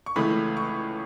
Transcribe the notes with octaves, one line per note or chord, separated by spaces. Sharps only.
C#6
C#2 C#3 E3 A3 B5
C#6